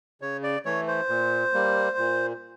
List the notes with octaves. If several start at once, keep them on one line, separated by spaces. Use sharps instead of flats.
C#3 C#5
D5
E3 A3 C#5
C5
A#2
G3 A#3
A#2